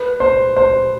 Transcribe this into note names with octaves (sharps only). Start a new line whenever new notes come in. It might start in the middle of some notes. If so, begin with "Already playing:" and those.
Already playing: B4
C5
C5